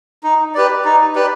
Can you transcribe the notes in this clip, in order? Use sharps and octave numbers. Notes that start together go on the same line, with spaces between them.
D#4
G4 B4 D5
D#4
G4 B4 D5